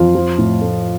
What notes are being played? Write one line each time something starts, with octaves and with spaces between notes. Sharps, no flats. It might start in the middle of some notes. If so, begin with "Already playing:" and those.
Already playing: F2 F4
F3
A2
A3